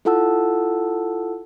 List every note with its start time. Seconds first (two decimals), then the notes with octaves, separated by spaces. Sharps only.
0.05 E4 F4 A4 F#5 A5 E6